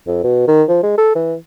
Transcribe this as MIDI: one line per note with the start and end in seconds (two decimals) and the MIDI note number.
0.07 0.22 41
0.24 0.46 47
0.48 0.63 51
0.69 0.79 53
0.83 0.95 56
0.98 1.12 69
1.15 1.35 52